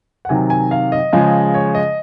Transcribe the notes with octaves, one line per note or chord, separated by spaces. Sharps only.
F#5
C3 D#3 F#3 G#5
G#5
F5
D#5
C#3 F3 G#3
C#5
D#5